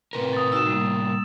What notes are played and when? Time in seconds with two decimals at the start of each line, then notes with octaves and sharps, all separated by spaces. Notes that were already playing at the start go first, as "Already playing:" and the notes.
0.13 A2 C3 C4 A#4 B4
0.33 D#6 A6
0.52 D#4 F#4 E6 E7
0.66 G3 A#3